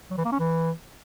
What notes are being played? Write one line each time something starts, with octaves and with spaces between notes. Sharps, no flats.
F#3
E3
A#3
C#4
E3